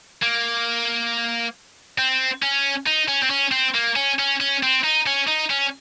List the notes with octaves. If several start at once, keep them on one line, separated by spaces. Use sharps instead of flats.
A#3
C4
C#4
D#4
C#4
C4
C#4
C4
A#3
C#4
C#4
C#4
C4
D#4
C#4
D#4
C#4